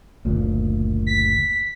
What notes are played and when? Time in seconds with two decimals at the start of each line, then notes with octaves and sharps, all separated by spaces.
0.25 F#1 D2 A#2
1.07 B6